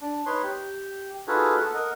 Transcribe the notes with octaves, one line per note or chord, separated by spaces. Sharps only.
D4
D#4 B4 C#5 C6
G4
D#4 F4 F#4 G#4 A4 B4
A4 F#5
A#4 D#5 F#5